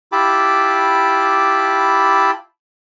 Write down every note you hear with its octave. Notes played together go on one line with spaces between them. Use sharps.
E4 F4 G4 A5 B5 D6